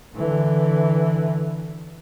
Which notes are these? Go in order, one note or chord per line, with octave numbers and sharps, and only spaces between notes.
D3 E3